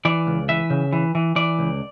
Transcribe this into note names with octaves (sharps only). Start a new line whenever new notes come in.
E3 D5
C#2
E3 E5
C#3
E3
E3
E3 D5
C#2